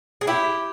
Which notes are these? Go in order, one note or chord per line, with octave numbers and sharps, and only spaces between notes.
G#4
E4 G4